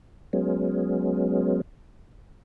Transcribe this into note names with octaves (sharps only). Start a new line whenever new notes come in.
F#3 G#3 B3 C#4